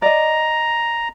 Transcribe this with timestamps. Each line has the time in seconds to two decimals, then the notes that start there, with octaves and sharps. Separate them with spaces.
0.02 D5 D#5 A#5